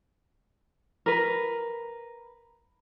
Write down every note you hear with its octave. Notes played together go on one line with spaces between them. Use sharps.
A#4 B4